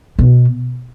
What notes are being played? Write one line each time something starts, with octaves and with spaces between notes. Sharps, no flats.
B2